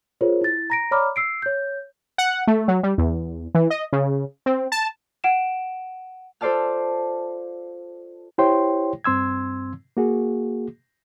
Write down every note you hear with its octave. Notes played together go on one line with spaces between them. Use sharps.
F4 G#4 A#4 C5 C#5
E4 A6
A#5 A#6 D7
C#5 D5 A#5 B5 D6 F6
E6 C7 D7
C#5 G6
F#5
A3
F#3
G3
E2
E3
D#5
C#3
C4
A5
F#5 D7 E7
F4 A4 C5 D5 A5 F6
E4 G4 C5 C#5 G5 C6
G2 C4 C6 E6 G#6
A#3 F#4 G#4